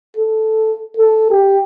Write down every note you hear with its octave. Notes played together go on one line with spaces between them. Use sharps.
A4
A4
G4